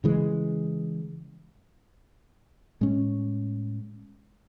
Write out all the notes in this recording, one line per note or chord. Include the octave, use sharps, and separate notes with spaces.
C#3 E3 G#3
A2 G#3 C#4